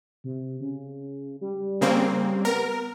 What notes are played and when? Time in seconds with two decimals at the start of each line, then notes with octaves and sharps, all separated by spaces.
0.24 C3
0.60 C#3
1.41 G3
1.81 C#3 A#3 C4
2.45 B3 A#4